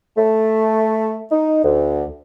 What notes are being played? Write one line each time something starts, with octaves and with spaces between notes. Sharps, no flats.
A3
D#4
D2